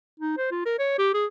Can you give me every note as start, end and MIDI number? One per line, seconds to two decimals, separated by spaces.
0.20 0.36 63
0.37 0.48 72
0.51 0.64 65
0.66 0.78 70
0.79 0.94 73
0.98 1.11 67
1.14 1.26 68